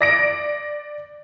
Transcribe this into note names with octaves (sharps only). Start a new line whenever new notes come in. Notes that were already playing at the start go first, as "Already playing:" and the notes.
D5 A#6 D7